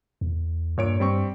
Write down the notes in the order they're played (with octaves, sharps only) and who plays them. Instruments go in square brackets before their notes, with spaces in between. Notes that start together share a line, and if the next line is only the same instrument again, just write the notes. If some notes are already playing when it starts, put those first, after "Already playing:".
[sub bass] E2
[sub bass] G2 [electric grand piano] A#2 C#5 D7
[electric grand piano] G3 C4 C#6